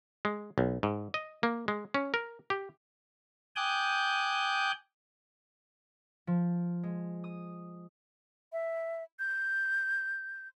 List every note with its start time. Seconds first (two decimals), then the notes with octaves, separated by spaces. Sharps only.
0.25 G#3
0.58 B1
0.83 G#2
1.14 D#5
1.43 A#3
1.68 G#3
1.94 C#4
2.14 A#4
2.50 G4
3.56 G5 G#5 D6 D#6 F#6 G6
6.27 F3
6.83 G#3
7.24 D#6
8.53 E5
9.19 G6